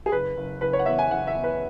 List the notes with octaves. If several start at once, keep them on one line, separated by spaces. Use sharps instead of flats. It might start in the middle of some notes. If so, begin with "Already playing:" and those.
G#4
F#1 B4
F#1
F#1 B4
C#5
F#5
E2 E5
G#5
F#1 F#5
E5
E2
B4